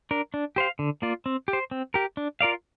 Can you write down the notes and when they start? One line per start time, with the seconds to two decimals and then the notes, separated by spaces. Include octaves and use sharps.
0.11 D4 A#4
0.34 D4
0.56 G4 C5 F5
0.79 D3
1.02 A#3 F4 D5
1.26 C4
1.48 G4
1.53 C5
1.71 C4
1.94 G4 A#4
2.17 D4
2.41 F4 A#4 D5 F5